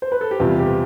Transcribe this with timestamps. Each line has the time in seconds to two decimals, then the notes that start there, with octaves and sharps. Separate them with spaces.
0.02 C5
0.12 B4
0.21 A4
0.31 G4
0.40 E2 C3 G3 F4
0.59 G4